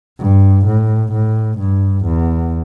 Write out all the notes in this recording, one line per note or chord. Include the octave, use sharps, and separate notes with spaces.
G2
A2
A2
G2
E2